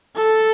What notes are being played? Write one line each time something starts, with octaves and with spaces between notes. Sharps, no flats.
A4